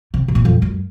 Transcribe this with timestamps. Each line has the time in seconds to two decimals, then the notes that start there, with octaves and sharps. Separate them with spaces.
0.14 C3
0.28 C3
0.35 A#2
0.45 F2
0.62 F#2